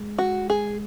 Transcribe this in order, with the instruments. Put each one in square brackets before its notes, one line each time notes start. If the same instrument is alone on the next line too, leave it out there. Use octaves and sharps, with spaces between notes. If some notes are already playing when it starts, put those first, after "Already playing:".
Already playing: [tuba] G#3
[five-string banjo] F#4
G#4